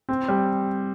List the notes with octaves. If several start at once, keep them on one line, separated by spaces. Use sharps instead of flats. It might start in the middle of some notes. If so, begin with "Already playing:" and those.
C4
G3